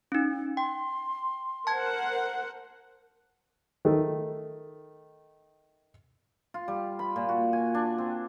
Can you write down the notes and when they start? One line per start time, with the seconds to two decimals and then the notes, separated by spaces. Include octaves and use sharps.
0.12 C#4 D#4
0.57 G5 C6
1.67 A#4 C5 F#5 A5 G#6
3.85 D#3 A3
6.54 F4
6.68 G3
6.99 B5
7.16 A#2
7.29 F#4
7.53 G#5
7.74 D4
7.98 C4